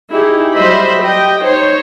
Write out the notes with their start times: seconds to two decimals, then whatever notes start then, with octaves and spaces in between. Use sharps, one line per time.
0.11 D#4 E4 G4 G#4
0.56 F#3 G3 C5 D#5 E5 B5
1.02 G4 D#5 G5
1.43 D#4 C5 C#5